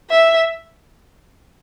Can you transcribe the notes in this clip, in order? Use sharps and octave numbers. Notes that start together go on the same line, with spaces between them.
E5